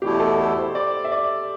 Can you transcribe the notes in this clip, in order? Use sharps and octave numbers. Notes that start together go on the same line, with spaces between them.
E2 B2 A3 E4 G4
A4
A4
C5
D5
E5
D5